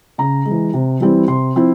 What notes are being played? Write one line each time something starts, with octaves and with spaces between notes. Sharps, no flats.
C#3 A#5
G#3
E3
C3
E3 G3 C4 E4
C3 C6
F3 C4 E4